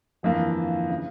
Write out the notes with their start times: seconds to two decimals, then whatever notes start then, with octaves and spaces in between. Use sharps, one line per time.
0.23 G1 F2 E3 A#3 F4
0.90 C#3